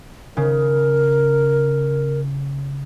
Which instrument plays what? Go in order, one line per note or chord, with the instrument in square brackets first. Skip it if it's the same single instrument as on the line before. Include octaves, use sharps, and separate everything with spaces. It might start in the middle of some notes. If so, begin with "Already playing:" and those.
[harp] C#3 [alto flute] A#4